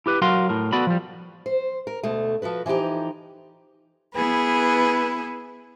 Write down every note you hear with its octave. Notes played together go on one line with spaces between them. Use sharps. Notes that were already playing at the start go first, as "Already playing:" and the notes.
E4 G4 B4
F#3 F#4 A#4 F5 C6
A2 A#4
B3 F#4 A4 D5 B5
F3 G3
C5
A#4
D2 B2 A3
F3 F#4 A4 B4
E3 F3 D#4 G4 A#5
B3 E4 G#4 B4